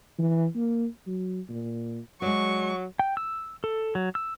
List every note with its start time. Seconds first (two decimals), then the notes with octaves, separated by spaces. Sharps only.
0.19 E3
0.56 A#3
1.07 F#3
1.49 A#2
2.22 F#3 G#3 D5 C#6
2.99 G5
3.17 E6
3.64 A4
3.95 F#3
4.15 E6